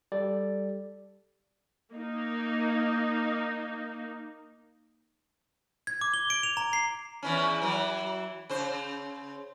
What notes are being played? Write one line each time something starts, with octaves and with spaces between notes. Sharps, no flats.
G3 G4 A4 D5
A#3 D#4
G#6
D6
G7
D7
F7
A#5
C7
E2 E3 C#4
E3 F#3
C#3 C5